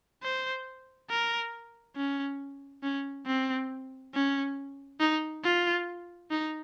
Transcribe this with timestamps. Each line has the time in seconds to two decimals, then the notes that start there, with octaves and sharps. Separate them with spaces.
0.23 C5
1.10 A#4
1.96 C#4
2.83 C#4
3.26 C4
4.14 C#4
5.00 D#4
5.44 F4
6.31 D#4